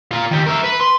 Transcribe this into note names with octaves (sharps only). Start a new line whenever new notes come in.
F4 A#4
D#3 G4
A#4 E5
B4
C6